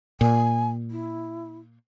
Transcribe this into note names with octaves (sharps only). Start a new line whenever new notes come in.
A#2 G#5
E4